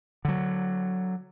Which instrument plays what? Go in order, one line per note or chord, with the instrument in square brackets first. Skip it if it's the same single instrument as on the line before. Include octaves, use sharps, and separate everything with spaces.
[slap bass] D3 F#3